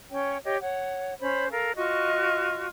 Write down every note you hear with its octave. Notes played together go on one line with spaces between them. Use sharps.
C#4 C#5 G5
G4 C#5 D#5
C#5 F#5
C#4 C5 C#5 B5
A4 A#4 F5
F4 F#4 D#5 C#6